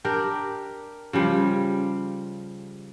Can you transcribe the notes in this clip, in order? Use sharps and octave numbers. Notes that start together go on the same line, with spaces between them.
D4 G4 A#4
C#3 F3 G3